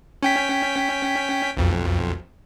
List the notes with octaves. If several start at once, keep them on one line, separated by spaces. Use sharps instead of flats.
C#4 G5 B6
B1 F2